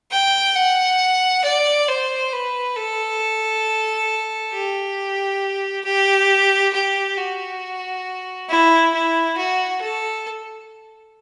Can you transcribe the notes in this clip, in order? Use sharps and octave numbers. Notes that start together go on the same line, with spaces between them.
G5
F#5
D5
C5
B4
A4
G4
G4
G4
F#4
E4
E4
F#4
A4